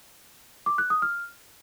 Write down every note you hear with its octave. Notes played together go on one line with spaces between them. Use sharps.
D6
F#6
D#6
F6